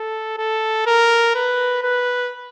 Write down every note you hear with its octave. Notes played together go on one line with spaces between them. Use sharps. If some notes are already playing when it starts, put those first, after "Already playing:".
Already playing: A4
A4
A#4
B4
B4